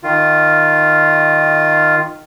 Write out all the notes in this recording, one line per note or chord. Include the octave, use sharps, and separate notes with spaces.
D#3 F4